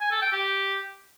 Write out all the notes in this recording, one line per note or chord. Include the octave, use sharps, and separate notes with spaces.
G#5
A4
G5
G4